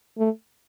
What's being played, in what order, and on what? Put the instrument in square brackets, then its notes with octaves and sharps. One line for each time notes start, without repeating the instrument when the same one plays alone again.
[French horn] A3